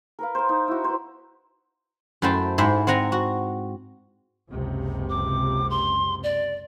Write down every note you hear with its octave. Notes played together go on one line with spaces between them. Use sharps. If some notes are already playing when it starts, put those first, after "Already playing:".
A#4 B4 F5
A#4 C5
D#4
E4 F#4
B4 C5
F#2 A3 E4 C5 G5 A5
G#2 G#3 E4 E5 G5
C4 F#5 G#5 A#5
F#4
F#1 C#2 C3
D6
C6
D5